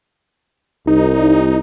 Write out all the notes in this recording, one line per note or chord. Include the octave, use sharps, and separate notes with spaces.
C2 D#4